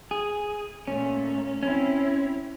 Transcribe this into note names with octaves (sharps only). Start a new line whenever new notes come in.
G#4
A#2 A3 C#4
C4 C#4 E4